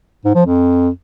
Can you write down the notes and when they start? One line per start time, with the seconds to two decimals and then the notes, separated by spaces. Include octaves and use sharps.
0.25 G#2
0.35 F3
0.45 F2